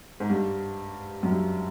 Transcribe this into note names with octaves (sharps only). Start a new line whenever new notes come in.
G#2
G2
F#2
G2